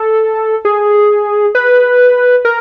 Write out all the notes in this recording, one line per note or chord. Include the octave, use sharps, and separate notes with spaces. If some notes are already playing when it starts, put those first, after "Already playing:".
Already playing: A4
G#4
B4
A#4